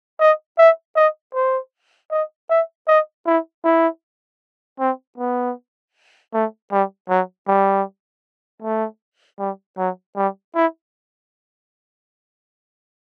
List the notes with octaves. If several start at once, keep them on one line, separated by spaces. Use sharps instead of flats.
D#5
E5
D#5
C5
D#5
E5
D#5
E4
E4
C4
B3
A3
G3
F#3
G3
A3
G3
F#3
G3
E4